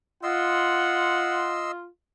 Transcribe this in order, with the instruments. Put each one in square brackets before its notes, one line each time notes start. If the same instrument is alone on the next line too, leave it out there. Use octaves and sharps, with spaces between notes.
[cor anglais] F4 [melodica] D#5 C6 E6 [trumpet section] F#5